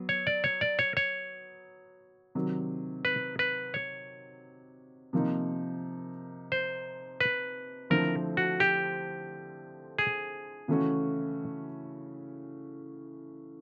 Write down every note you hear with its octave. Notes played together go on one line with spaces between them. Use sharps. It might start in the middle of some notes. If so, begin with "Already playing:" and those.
Already playing: F#3 B3
C#5
D5
C#5
D5
C#5
C#5
C3 D#3 F#3
B4
B4
C#5
C3 F3 A#3 D#4
C5
B4
D3 F3 A3 C4 E4 A#4
F#4
G4
G#4
C#3 E3 A3 C#4 F#4